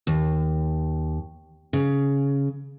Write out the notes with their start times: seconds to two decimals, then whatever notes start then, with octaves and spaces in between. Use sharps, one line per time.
0.07 D#2
1.73 C#3